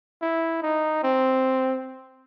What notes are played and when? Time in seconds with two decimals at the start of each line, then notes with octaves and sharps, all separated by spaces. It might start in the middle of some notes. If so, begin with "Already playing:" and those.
0.22 E4
0.62 D#4
1.03 C4